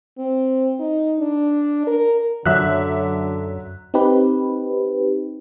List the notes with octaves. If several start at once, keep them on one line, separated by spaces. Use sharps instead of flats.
C4
D#4
D4
A#4
F#2 D3 F#3 E5 F#6
C4 D#4 G4 B4